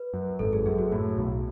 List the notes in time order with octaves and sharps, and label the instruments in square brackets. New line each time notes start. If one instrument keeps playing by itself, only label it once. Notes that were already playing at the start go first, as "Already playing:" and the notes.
Already playing: [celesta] B4
[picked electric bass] F#2
[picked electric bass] G#1 [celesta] A4
[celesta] G#4
[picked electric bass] F#2 [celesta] G#4
[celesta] F#4
[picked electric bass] A2 [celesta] F#4
[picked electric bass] B1